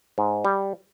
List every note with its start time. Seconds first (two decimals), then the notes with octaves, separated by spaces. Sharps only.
0.18 G#2
0.45 G3